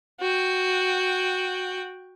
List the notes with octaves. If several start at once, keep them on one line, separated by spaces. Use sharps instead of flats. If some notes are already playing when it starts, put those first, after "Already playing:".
F#4 G5